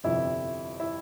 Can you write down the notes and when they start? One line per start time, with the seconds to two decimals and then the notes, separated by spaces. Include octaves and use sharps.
0.04 G1 F2 C3 E4 E5
0.80 E4 E5